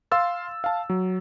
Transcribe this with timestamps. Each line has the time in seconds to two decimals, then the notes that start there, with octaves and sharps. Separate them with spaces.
0.11 F5 C6 E6 A6
0.64 F5 A5
0.90 F#3